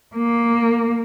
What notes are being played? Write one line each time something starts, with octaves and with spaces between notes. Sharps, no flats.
A#3